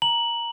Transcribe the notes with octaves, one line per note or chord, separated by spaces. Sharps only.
A#5 F#7